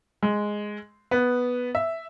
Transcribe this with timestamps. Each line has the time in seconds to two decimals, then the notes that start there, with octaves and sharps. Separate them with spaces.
0.23 G#3
1.11 B3
1.75 E5